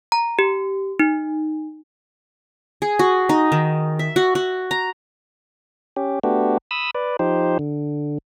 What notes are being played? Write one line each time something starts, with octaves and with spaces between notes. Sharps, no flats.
A#5
G4
D#4
G#4
F#4
D#4
D#3
E5
F#4
F#4
A#5
C#4 G4
A3 B3 D4 F#4 G4
B5 D#6 E6
B4 D5
F3 D#4 G4 C5
D3